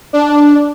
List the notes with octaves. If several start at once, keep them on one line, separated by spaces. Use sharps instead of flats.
D4